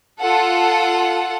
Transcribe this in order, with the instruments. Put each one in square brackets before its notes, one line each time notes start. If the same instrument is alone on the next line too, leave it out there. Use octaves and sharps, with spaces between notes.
[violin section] F4 A4 F#5